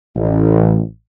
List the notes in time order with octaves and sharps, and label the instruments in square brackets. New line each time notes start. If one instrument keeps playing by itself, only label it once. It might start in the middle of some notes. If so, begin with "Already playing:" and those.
[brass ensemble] A1